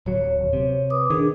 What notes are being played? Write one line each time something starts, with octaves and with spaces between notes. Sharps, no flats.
D1 F#3 C#5
D#1
C3
B4 D6 D#6
D#3 D4 G#4